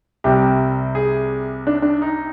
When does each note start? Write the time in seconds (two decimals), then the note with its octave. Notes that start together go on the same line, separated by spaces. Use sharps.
0.24 C2 C3 G3 G4
0.95 G#4
1.67 D4
1.82 D4
2.02 D#4